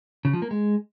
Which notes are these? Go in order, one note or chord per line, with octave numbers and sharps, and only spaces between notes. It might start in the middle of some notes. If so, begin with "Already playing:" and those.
C#3
F3
A#3
G#3